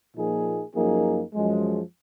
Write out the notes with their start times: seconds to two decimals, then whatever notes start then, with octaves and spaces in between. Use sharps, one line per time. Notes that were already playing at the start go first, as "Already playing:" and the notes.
0.15 A#2 F3 A#3 D#4 G#4
0.74 F#2 F3 A#3 D#4 G#4
1.34 F#2 F3 G#3